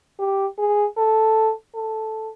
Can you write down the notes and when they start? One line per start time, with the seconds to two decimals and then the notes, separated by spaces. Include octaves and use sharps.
0.19 G4
0.59 G#4
0.97 A4
1.75 A4